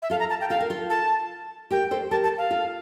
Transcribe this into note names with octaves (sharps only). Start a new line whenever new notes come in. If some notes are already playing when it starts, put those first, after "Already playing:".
E5
F4 A4 F5
A#5
A5
G5
F4 A4 F5
A#4
F4 A4
A5
G4 A#4 G5
A4 C5
G4 A#4 A5
A5
F5
F4 A4